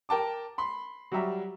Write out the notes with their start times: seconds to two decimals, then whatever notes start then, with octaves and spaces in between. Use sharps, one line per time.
0.09 A#4 G5 A5 D6
0.58 B5 C6
1.12 F#3 G3 G4 E5 A#5